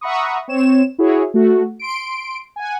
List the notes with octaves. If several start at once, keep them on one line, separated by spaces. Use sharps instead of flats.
E5 F#5 A#5 B5 C#6 D#6
C4 C#5 E7
E4 F#4 G#4 C#5
A3 F#4
C6 D7
F#5 G#5